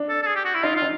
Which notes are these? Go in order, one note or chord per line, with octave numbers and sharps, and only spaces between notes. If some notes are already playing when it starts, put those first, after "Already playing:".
Already playing: D4
A4
A4
G#4
G4
F#4
E4
D#4 F4
F4
D#4